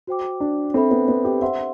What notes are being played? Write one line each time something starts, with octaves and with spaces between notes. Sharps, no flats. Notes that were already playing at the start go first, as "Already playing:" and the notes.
F#4 C5 G5 D6
D4
C4 A4 C5 E5 B5
B3
B3
G4
C5 E5 F#5 C6